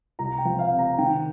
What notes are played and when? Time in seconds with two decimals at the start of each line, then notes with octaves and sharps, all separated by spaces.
0.19 C2 A#5
0.38 G5
0.45 F3
0.59 F5
0.72 C3
0.79 A#5
0.98 D#3 G5